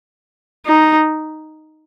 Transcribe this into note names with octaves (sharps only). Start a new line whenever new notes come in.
D#4